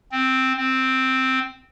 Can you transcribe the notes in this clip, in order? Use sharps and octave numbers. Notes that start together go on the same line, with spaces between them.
C4
C4